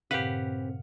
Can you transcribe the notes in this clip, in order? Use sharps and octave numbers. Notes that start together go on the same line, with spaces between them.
G2 A#2 C#3 C4 G4 B4 F5 F#5